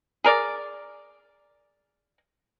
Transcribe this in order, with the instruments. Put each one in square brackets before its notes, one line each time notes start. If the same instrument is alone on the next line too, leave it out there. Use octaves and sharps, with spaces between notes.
[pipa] G#4 A#4 D5